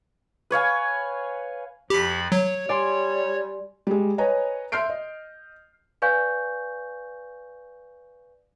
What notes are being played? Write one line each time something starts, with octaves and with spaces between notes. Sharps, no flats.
B4 C#5 F5 G#5
F2 F3 G4 B5 B6
F#3 C#5
G3 D5 G#5 C6
G3 G#3
B4 C#5 D#5 G#5 A#5
E5 C6 F6 G6 C7 D7
D#5
B4 D5 F5 G#5 C#6 G6